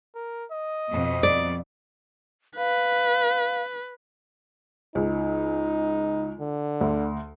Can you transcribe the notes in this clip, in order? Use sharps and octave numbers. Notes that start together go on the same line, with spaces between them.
A#4
D#5
F2 B2
D5
B4 F5
C#2 D#4
D3
D2